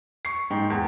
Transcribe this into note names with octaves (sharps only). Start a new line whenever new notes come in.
C#6 C7
G#2 G5
E2